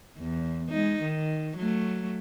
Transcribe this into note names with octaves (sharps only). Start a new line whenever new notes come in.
E2
G#3 D#4
D#3
F#3 A3